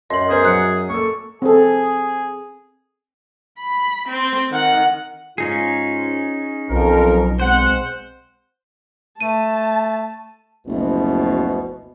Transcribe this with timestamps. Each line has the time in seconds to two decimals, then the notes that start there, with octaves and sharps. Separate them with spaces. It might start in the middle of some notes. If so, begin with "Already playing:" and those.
0.10 F#2 D#5 C6 F#7
0.30 B3 G#4 A#4 C5
0.45 F#3 F#6 C#7
0.90 A#3 A4 C#6
1.42 C4 G#4 A4
3.59 B5
4.08 C4
4.51 D#3 F#5
5.38 G#2 C#4 D#4 F4 G#4
6.70 B1 F2 A#4
7.40 G#3 C4 C5 F#5
9.20 A3 A5 D#7
10.67 F#1 D2 B2 F3